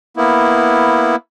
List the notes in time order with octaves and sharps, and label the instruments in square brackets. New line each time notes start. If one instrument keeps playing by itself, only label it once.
[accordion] A#3 B3 E4